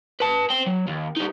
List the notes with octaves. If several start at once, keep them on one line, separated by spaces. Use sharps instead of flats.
B4 A5
C5 G5
F#3
D#2
G3 D#4